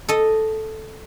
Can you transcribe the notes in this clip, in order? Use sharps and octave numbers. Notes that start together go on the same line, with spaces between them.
A4 D#5